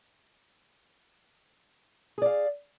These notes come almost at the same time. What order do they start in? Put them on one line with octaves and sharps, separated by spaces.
G#4 D5 F5